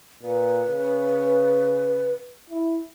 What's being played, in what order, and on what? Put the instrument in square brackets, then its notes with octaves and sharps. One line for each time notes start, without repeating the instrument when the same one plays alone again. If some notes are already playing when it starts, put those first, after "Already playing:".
[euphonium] A#2 [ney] B4
[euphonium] C#3
E4